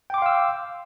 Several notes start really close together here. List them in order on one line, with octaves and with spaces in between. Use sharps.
G5 D6 C6 F5 E6